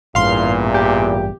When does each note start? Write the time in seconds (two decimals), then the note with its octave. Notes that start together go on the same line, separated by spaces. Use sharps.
0.15 A1 E2 G2 A#2 F5 C6
0.75 G4